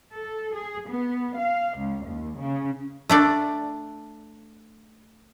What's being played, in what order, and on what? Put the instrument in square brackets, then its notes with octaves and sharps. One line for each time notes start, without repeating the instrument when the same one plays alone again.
[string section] A4
G#4
B3
F5
C#2
D#2
C#3
[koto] A3 D4 D5